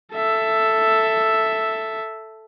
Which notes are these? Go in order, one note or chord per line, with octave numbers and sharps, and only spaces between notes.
A4 E5